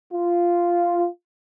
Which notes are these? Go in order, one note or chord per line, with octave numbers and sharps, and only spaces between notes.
F4